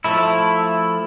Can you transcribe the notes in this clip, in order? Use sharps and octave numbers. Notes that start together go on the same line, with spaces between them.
F3 A3 E4